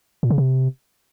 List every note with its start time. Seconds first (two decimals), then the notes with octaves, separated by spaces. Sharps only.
0.23 A#2
0.30 C#3
0.38 C3